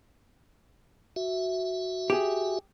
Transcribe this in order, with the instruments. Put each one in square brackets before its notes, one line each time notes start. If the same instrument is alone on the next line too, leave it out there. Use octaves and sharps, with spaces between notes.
[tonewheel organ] F#4 E5
[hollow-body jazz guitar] G4 G#4